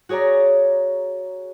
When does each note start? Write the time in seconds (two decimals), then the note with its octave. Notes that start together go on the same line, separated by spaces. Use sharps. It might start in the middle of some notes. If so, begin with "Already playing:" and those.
0.09 F#4 G#4 C#5 D5 A#5